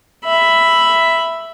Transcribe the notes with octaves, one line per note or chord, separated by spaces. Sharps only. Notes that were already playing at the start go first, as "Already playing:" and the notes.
E5 B5